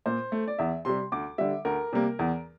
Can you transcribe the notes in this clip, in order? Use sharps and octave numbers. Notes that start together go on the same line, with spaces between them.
A#2 C5
A3
D5
E2 E5
C3 G3 C6
D2 D6
D3 G3 E5
D2 A#4
C3 G3 A#3
E2